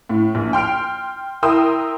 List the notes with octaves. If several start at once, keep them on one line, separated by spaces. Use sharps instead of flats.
A2
A#1
G5 C6 F6 D7
E4 A#4 G5 C6 D#6 E6